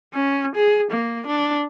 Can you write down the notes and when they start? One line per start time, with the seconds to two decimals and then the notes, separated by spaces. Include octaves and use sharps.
0.14 C#4
0.55 G#4
0.91 A#3
1.27 D4